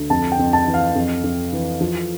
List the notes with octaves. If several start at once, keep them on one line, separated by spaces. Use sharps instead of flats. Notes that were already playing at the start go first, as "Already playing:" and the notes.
Already playing: D2
F2 A5
G5
F2
A5
E3
F5
F2
F2
E3
F3